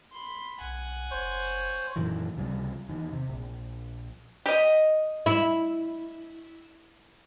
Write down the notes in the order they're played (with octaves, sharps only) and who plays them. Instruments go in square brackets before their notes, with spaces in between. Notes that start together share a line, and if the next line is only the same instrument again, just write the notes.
[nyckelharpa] B5 C6
[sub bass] B1 [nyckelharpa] F#5 G#5
[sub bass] F#1 [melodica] C5 C#5
[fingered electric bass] F#2 A#2 D#3 E3
C#2 C3 F3 G3
E2 D#3
C3
A#1
[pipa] G4 D#5
[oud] E4